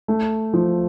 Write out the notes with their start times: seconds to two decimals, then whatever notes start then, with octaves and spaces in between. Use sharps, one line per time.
0.08 A3
0.53 F3